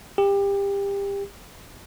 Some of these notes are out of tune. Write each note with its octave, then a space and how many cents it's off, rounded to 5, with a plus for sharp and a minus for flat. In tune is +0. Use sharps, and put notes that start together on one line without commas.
G4 +25